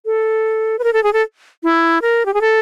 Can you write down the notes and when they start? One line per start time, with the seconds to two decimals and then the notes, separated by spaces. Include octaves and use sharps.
0.06 A4
0.79 B4
0.84 A#4
0.93 A4
1.04 G#4
1.13 A4
1.63 E4
2.02 A#4
2.26 G4
2.34 G#4
2.41 A4